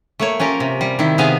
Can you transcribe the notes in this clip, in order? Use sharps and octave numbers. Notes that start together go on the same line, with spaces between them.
A3 A#3 C#5
C#4 F4 G4 A#4
C3
G3
D#3 C4 E4
C3 B3 G#4 F5 G#5